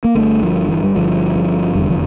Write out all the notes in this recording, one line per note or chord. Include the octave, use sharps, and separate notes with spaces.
A#3
G1 G2 D3 A3
F3
E3
G3
G1 G2 D3 F3
F3
F1 E2 D3 G3
F3